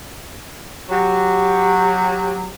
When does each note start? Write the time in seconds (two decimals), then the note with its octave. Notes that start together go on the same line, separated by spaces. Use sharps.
0.89 F#3 G4